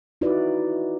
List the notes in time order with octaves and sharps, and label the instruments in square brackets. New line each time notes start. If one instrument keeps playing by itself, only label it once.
[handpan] D#4 E4 F#4 B4 D5